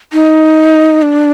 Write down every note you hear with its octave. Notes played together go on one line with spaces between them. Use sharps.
D#4
D4